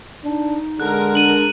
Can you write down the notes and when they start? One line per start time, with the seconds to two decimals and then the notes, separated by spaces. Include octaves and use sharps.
0.25 D4 D#4
0.80 D3 G#3 A#4 F#6
1.15 D4 D#7 F#7